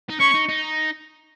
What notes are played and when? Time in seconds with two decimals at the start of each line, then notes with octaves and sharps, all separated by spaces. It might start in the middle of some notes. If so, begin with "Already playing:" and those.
0.09 D#4
0.20 C#4 C#6
0.34 D#4
0.49 D#4